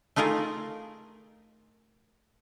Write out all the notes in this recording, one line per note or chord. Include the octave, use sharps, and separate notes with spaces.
A3 D#4 F4 G#4 A#4